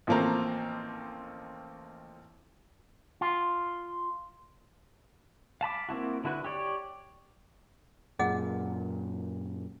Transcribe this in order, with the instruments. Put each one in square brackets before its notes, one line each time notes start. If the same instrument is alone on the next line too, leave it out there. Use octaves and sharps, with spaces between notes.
[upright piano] A1 F3 A3 A#3 C4 A#5
[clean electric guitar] F4
[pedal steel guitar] F5 A5 B5 D6
A#3 C4 E4 F#4
D3 E4 F#4 B4
G4 C#5 D5
[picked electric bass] F#2 A#2 [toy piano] G#4 D#5 F#5